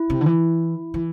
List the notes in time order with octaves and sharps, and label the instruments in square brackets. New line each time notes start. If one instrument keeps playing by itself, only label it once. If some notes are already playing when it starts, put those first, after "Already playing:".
Already playing: [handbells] E4
[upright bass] C3
D3
E3
E3